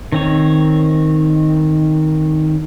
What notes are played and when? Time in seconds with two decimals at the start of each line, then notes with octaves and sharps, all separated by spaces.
0.12 D#3 C4 C#5